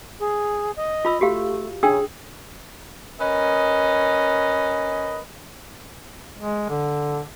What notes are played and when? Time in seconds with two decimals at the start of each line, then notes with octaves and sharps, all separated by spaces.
0.20 G#4
0.76 D#5
1.05 F4 B5 E6
1.21 A3 F#4 G4 F5
1.83 C#3 D4 G#4 G5 E6
3.20 C#4 A#4 B4 D#5
6.38 G#3
6.69 D3